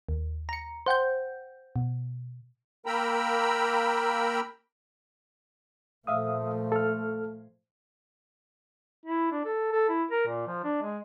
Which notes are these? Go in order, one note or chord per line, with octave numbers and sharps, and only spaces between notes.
D#2
A#5 C#7
C5 F#5 G5 G6
B2
A#3 A#4 G5 A#5 B5 E6
A#2 F3 A3 E5 F5 D#6
A4 F6
E4
D4
A4
A4
E4
A#4
A#2
F3
D4
G#3